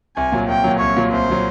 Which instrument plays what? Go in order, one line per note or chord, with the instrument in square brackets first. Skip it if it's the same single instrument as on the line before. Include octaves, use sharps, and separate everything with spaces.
[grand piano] C2 [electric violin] G#5
[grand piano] A#2 F#3
[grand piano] C2 [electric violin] G5
[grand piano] A#2 F#3
[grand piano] C2 [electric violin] C#5
[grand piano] A#2 F#3
[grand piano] C2 [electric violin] C5
[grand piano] A#2 F#3